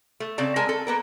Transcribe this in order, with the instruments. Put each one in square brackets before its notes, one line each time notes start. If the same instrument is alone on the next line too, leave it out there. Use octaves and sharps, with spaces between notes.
[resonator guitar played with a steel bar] A3
C#3 C4 D5 A5
G#3 A#4 G#5 A5
A4
A#3 B3 A#4